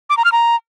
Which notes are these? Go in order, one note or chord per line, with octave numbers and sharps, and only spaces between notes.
D6
A#5
F6
A#5